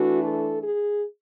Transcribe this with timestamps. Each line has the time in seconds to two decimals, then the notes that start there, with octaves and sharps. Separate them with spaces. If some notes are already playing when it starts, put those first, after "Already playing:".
Already playing: E3 A3 D4 F#4
0.23 A4
0.62 G#4